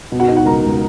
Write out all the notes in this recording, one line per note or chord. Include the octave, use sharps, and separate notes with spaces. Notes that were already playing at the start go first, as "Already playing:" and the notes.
B2
F#4 F#5
B2 D#4 D#5
F#4 F#5
C#2 A#4 A#5
C#2